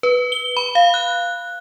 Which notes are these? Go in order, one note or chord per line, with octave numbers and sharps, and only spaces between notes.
B4
G7
B5
F5
F#6